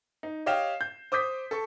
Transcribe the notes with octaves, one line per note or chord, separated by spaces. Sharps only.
D#4
G4 C#5 D#5 F5 G5 E7
G6
C5 D6 D#6 G6 B6
A4 A5 C#6